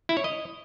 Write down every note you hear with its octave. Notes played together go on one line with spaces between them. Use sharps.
E4
C#5
D#5